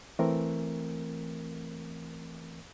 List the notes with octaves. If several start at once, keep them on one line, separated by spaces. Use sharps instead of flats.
E3 A3 C4 A#4